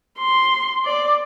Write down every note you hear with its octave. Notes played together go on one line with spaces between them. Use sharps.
C6
D5